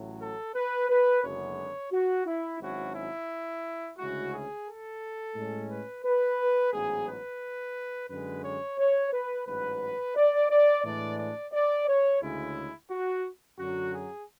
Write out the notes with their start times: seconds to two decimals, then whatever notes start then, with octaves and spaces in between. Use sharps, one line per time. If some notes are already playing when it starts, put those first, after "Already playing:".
Already playing: A1 A2 F#3 A3
0.21 A4
0.55 B4
0.90 B4
1.24 F#1 F#2 D3 G#3 B3 C#5
1.92 F#4
2.26 E4
2.61 G#1 G#2 F#3 C#4 E4 F#4
2.95 E4
3.98 D2 C#3 G#3 C#4 E4 F#4
4.32 G#4
4.67 A4
5.35 A2 G#3 C#4
5.70 B4
6.04 B4
6.73 A1 G#2 F#3 B3 G#4
7.07 B4
8.10 F#2 D3 G#3 B4
8.44 C#5
8.78 C#5
9.13 B4
9.47 A1 G#2 F#3 B4
10.16 D5
10.50 D5
10.84 A2 E3 G#3 D4 D5
11.19 D5
11.53 D5
11.88 C#5
12.22 D2 C#3 G#3 C#4 E4
12.90 F#4
13.59 F#2 D3 F#3 C#4 F#4
13.94 G#4